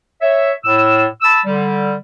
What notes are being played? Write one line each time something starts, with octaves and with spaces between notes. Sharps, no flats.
C#5 E5
A2 E6
A5 B5 E6
D3 G3